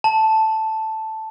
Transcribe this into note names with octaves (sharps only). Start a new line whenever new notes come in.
A5